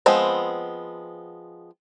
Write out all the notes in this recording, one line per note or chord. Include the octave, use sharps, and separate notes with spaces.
F3 G#3 B3 C4